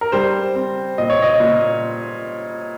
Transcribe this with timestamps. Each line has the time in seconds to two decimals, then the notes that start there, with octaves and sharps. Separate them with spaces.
0.01 A#4
0.12 G3 C5
0.55 C4
0.98 A#2 D#5
1.10 C#5
1.22 D#5
1.40 A#2